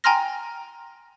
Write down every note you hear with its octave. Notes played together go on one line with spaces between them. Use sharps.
G5 G#5 A#5 C6 F6 A#6